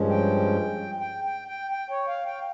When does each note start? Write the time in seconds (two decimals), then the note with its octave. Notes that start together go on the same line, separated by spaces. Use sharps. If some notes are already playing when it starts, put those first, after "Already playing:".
Already playing: G2 F3 G#3 C#4
0.10 G5
1.00 G5
1.24 G5
1.48 G5
1.71 G5
1.90 C#5
2.08 F5
2.26 G5